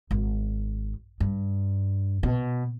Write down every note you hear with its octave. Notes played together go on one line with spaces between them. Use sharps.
G#1
G2
B2